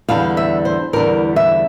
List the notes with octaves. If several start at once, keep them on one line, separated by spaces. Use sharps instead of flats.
E2 D3 G3 F5
E5
C5
E2 D3 G3 A#4
E5